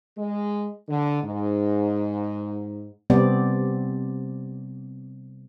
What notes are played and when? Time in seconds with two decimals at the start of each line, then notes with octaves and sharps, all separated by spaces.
0.18 G#3
0.89 D3
1.23 G#2
3.10 C3 G3 B3 C4 D5